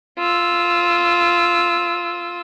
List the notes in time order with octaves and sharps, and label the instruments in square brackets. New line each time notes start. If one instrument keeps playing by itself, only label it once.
[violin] F4 E6